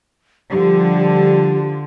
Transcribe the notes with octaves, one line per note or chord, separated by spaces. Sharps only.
D3 F3 G3 G4